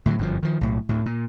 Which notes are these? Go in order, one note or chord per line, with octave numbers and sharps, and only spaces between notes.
A2 D3 F3 F#3
G1 F#2 B2 F3
D#3 F3
B1 A2
D2 A2
A#2